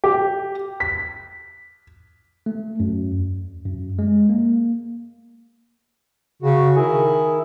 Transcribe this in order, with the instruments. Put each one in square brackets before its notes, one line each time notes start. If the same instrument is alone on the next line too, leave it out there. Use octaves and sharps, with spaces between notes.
[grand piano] G4
B6
[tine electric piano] A3
F#2
E2
F#2
G#3
A#3
[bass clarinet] C#3 [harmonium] F#4
[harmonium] D#3 E4 [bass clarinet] G#4